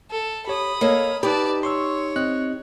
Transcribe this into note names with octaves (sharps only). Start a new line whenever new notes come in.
A4
G4 C#5 B5 D#6
A#3 A4 C#5 D#5 F5
D#4 G4 B4 D5 A5 B5
C#5 C6 C#6 E6
C4 D#5 F#6